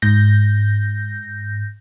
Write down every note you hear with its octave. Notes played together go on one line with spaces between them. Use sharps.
G#2 G6 A#6